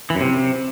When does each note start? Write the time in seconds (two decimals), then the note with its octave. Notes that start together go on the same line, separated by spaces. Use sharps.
0.10 E3
0.15 F#2
0.21 C3